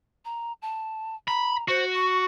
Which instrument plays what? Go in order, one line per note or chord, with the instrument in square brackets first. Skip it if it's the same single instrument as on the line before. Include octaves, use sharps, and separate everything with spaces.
[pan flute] A#5
A5
[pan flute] A#5 [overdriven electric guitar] B5
[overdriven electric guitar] F#4 [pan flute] C5
[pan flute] C#6